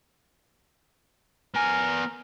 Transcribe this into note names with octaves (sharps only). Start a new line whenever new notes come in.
B3 A#4 G#5